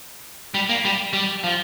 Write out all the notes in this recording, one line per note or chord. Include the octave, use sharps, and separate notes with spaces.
G3
A#3
G3
G3
F3